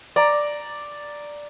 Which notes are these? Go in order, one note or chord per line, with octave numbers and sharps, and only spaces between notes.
D5 A#5